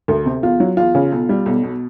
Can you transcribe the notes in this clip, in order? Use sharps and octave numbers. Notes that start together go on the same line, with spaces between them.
D2
C3
E2 F4
F#3
E2 F4
C#3
B1
G3
B1
B2